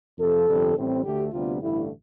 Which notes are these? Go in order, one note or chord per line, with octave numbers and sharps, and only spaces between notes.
F2 C3 F3 A4
G1 F2 C3 G3
A1 A2 G3 C4
D2 D3 A3 G4
D2 C3 G3 B3 D4 F4
A1 G2 D3 A3 E4